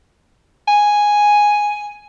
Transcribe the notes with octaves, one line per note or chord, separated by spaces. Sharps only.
G#5